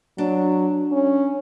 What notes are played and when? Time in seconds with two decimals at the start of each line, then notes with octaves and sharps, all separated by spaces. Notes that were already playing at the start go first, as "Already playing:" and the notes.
0.18 F#3 D4
0.92 C#4